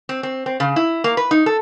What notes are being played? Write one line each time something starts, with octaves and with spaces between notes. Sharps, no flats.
C4
C4
C4
C#3
E4
A#3
B4
D#4
A4